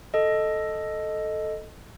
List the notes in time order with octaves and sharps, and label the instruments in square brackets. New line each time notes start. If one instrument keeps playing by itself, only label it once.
[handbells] A4 D#5